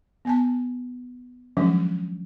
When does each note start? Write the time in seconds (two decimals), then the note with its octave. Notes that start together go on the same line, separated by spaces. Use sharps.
0.25 B3 G#5 A5
1.57 D#3 F3 F#3 G#3 C#4 D4